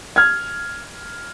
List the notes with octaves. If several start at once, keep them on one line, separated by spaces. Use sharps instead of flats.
F6 G#6